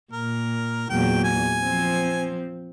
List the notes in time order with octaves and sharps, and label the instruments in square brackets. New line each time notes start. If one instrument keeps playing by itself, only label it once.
[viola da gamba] A#2 [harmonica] A#4
[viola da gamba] E2 A#2 F#3 [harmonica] G5
[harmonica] G#5
[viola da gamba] F3 C4